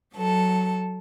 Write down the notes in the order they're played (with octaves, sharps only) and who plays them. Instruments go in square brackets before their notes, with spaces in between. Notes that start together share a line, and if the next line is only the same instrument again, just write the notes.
[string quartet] F#3 A4